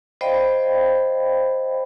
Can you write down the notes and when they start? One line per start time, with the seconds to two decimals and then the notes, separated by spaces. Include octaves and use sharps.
0.21 C5 D5 D#5 F5 G5 B5